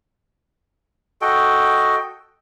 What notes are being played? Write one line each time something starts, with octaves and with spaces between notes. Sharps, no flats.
F#4 A4 D#5 G5